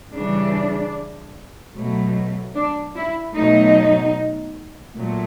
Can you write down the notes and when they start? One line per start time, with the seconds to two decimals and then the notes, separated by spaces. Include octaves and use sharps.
0.13 C#3 E3 G3 D4
1.74 B2 F#3 A3
2.55 D4
2.95 E4
3.35 B2 F#3 A3 D#4
4.95 A#2 F#3 A3